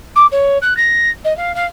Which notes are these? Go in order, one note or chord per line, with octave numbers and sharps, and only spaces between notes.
D6
C#5
F#6
A#6
D#5
F5
F5